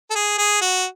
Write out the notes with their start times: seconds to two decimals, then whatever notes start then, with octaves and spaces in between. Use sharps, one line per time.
0.11 A4
0.16 G#4
0.38 G#4
0.62 F#4